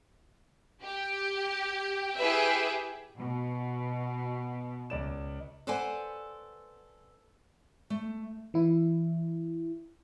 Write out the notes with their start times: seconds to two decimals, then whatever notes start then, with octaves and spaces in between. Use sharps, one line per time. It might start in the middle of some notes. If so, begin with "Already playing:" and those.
0.82 G4
2.17 E4 G4 G#4 B4 E5
3.18 B2
4.90 C#2 D5 E7
5.67 A4 B4 C5 D5 F#5 G#5
7.90 A3
8.54 E3 E4